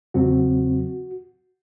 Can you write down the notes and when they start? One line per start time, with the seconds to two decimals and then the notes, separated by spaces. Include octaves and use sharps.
0.14 E2 C#3 F#3 C4 F#4